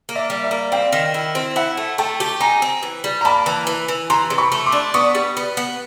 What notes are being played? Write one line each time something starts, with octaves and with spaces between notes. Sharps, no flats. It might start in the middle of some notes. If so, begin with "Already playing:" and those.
A#3
D5 E5
G3
D5 E5
A#3
C4 F5 G5
D#3
E4
C4
E4 E5 F#5
A3
A3 G5 A5
G4
D#4 G#5 A#5
C4
E3
G3
A#5
A#3 A5 B5
E3
E3
E3
E3 A#5 C6
C3
B5 C#6
A3
C6 D6
D4
B3 C#6 D#6
G3
B3
B3